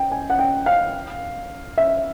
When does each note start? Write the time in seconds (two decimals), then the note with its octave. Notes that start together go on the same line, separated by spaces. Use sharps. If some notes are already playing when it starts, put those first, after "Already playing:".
Already playing: G5
0.12 G#5
0.30 F#5
0.39 G5
0.66 F5
1.78 E5